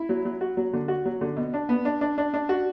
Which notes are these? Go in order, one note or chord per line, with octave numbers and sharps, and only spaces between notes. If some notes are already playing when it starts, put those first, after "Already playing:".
Already playing: E4
F#3
F#3
F#4
F#3
D3
F#4
F#3
D3
B2
D4
B3
D4
D4
D4
D4
F#4